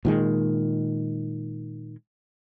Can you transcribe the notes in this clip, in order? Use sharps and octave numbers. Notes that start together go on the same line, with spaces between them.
A#2 D#3 G#3